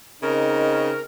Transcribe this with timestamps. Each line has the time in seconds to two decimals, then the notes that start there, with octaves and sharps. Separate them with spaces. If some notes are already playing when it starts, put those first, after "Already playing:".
0.22 C#3 C4 D#4 A#4 D#5